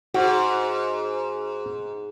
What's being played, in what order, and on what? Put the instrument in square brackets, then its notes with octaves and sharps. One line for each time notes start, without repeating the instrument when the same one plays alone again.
[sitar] G#2 [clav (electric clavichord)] F#4